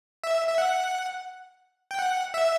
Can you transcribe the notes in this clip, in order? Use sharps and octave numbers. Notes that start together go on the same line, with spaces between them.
E5
E5
F#5
G5
F#5
E5